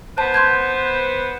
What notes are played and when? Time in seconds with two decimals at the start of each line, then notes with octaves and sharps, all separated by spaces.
0.18 B3 B4 C5 A5
0.34 C6 G6 G#6